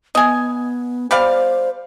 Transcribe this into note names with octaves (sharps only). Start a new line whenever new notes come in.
B3 D#5 G#5
G3 C5 D5 F5